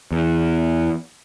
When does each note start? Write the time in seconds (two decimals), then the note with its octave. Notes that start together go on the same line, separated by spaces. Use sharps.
0.12 E2